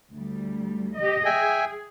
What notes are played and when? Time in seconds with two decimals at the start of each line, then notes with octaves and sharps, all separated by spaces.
0.12 D2 G3
0.96 G4 D#5
1.25 G#4 E5 G5 G#5